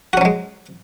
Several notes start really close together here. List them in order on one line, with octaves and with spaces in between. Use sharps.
F#4 C#4 F#3 G#3